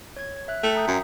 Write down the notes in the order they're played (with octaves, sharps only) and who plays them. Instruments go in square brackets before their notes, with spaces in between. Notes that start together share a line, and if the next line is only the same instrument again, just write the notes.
[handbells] C#5 G#6
E5 F#6
[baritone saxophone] A3 [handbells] E5 G5 C#7
[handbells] A#5 D#6 G6
[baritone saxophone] F#2